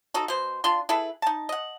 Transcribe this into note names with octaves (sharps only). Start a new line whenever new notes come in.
D#4 F#4 A4
B2 C5
D4 F4 C6
E4 G#4 A4 B4
D#4 A5
D#5 F#5